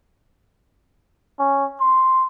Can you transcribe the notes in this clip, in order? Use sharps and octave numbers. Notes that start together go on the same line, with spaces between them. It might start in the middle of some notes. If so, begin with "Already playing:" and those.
C#4
C6